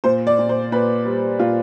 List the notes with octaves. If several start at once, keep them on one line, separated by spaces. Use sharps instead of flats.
A#2 C5
D5
A#2
C5
A#2 B4
G3
A#2 F4